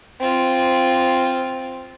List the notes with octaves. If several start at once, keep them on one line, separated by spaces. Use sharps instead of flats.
C4 F4